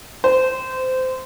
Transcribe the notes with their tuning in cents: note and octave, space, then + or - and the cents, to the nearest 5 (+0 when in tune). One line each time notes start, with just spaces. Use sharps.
C5 -20